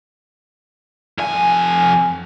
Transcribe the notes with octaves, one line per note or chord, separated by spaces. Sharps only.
F2 G#5